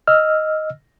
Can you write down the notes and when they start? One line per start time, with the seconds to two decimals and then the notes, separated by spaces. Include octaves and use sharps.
0.07 D#5 E6 F6